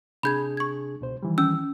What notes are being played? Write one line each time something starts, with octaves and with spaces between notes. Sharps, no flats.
C3 D4 G#4 B5 G6 G#6
C#6 G#6
C#2 B2 C5
D#3 E3 G3
C#4 E6